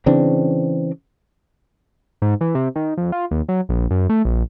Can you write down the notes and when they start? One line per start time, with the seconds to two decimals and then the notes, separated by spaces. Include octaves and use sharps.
0.06 C#3 E3 C4 D4
2.22 G#2
2.41 E3
2.55 C3
2.76 D#3
2.97 F2
3.12 F4
3.31 D#2
3.49 F#3
3.69 A#1
3.91 F#2
4.09 A3
4.25 A#1